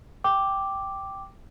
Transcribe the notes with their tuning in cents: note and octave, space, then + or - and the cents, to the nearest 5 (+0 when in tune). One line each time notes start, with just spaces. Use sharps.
G5 -5 D6 +0